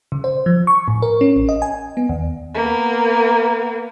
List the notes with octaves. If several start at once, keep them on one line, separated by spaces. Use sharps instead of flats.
C#3
C5
F3
C#6
A2
A#4
C#4
A1
D#5
G#5
B3
D#2
A#3 B3